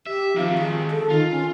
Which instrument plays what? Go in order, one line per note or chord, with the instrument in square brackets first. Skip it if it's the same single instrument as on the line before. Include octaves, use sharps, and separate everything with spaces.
[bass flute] G4 [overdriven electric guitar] E5
[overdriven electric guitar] D#3 C4 [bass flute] F3
[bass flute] G#4
A4
[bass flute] D#3 [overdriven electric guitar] F4
[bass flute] C#4